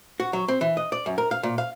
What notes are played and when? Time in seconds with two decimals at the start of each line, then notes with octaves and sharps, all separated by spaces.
0.20 F#4
0.33 F#3
0.48 C4
0.61 E3
0.77 D#5
0.92 D5
1.06 F#2
1.18 A#4
1.31 F5
1.43 A#2
1.58 F5